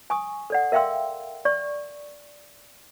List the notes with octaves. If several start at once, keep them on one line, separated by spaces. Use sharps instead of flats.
G#5 C#6 D#6
A4 D5 F#5
A#4 E5 F5 G5 C6 E6
D5 C#6